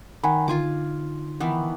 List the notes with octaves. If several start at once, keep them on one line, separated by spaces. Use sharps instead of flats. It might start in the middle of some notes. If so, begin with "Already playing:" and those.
D#3 F#5 G#5 B5
D3 D#4 F4 G#5 C6 D6
D#3 E3 B3